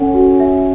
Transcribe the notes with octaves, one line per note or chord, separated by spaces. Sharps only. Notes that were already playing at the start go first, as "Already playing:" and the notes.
Already playing: C#4 A4 F#5
F#4
E5